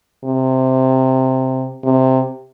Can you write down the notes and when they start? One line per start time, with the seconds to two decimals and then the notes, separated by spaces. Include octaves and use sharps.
0.24 C3
1.84 C3